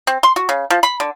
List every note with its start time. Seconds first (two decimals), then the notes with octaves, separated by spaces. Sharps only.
0.07 C4
0.23 C6
0.36 F#4
0.49 C#3
0.70 F3
0.83 B5
1.00 D3